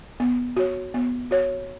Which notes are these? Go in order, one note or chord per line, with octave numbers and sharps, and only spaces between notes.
B3
F#4 C#5
B3
F#4 C#5